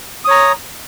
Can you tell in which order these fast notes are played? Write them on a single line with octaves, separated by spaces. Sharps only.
D#6 C#5 A#5